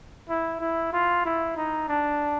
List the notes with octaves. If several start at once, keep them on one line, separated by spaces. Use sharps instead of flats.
E4
E4
F4
E4
D#4
D4